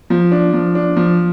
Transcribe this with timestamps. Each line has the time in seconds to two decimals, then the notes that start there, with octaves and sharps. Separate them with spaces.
0.10 F3
0.32 D4
0.53 F3
0.75 D4
0.97 F3